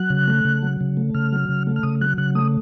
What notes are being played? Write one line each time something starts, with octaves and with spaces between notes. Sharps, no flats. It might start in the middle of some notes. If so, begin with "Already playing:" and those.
Already playing: F#3 F#6
C#3
A3
C#3
F#3
C#3
A3
C#3 F6
F#3
C#3
A3
F6
C#3 D#6
F#3 F#6
C#3 F#6
A3 D#6